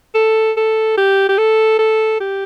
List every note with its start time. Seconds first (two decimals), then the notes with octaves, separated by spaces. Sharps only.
0.15 A4
0.57 A4
0.97 G4
1.29 G4
1.38 A4
1.79 A4
2.20 G4